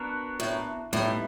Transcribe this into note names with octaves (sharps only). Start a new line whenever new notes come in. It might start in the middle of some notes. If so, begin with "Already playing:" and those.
Already playing: B3 D4 F#4 A#4
A2
A2 G3 B3 D#4